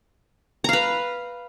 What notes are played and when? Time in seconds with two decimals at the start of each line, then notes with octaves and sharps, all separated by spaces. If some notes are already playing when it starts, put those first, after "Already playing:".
0.64 A#5
0.69 F5
0.73 B4